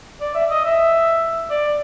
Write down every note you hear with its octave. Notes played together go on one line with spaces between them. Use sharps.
D5
E5
D#5
E5
D5